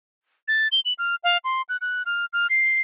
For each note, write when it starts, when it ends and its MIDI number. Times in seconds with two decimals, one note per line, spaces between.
0.48 0.68 93
0.72 0.80 103
0.85 0.93 102
0.98 1.15 89
1.24 1.38 77
1.44 1.62 84
1.69 1.77 90
1.81 2.03 90
2.06 2.25 89
2.33 2.47 89
2.50 2.81 96